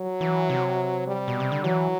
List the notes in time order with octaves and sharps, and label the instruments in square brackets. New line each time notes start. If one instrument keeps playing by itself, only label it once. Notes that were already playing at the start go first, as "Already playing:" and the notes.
Already playing: [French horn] F#3
[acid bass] E3
C3
[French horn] G3
[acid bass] B2
C3
D3
[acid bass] E3 [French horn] F#3